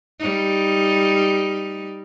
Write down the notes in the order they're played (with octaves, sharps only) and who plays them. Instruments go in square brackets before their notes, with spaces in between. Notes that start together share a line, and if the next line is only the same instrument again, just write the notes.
[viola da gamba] G3 D#4